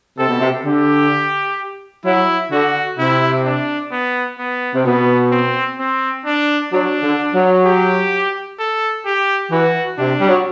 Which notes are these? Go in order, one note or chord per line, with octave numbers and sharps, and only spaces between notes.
C3 A4
B2
C3
D3 G4
F#3 E4
D3 F#4
C3 E4
D4
B3
B3
C3
B2 B3
C4
C4
D4
F#3 D4
D3
F#3
G4
A4
G4
E3 F#4
C3 D4
G3
F#3